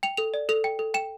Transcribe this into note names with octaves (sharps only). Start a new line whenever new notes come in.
G5 F7
A4 F7
D5
A4 F7
G5
A4
G5 E7